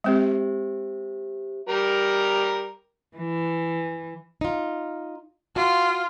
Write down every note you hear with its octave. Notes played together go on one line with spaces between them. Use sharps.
G#3 C4 G4 C5 E5
G3 A#4 A#5
E3
D#4 F4
F4 F#4